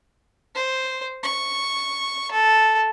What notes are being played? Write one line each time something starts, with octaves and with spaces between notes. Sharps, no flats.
C5
C#6
A4